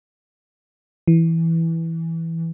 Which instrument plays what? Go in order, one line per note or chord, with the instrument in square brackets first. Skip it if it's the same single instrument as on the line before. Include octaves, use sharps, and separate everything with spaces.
[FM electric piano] E3